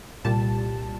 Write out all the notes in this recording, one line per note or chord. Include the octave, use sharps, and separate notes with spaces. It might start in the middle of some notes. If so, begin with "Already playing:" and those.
C2 A#2 G3 A5